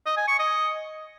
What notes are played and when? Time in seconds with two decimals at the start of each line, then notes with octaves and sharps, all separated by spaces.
0.06 D#5
0.17 G#5
0.28 C#6
0.39 D#5